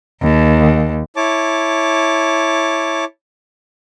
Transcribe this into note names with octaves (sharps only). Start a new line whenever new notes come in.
D#2
E4 C#5 A5 D6